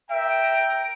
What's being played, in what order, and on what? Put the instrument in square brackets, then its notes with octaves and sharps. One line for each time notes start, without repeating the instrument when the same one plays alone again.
[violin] A#4 D7 [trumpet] E5 [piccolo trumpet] G5